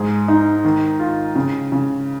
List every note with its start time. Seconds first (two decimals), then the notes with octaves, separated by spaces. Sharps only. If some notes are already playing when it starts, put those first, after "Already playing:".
Already playing: G#2 G#4
0.28 D#4
0.65 D#3
0.99 F4
1.36 C#3
1.72 C#3